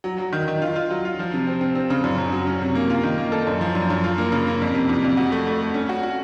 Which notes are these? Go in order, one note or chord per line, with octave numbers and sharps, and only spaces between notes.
F#3
F#3
D#3
D#3
F4
F4
F#3
F4
F3
C3
C4
C4
C4
C#3
F#2
F#2
F#3
C#4
C3
A#3
F4
D#3
A#3
A4
F#2
F3
F#2
F#2
F4
A#3
C#3
A#3
F2
C3
F2
F2
F#4
A3
A3
A3
C#4
F#4
F#4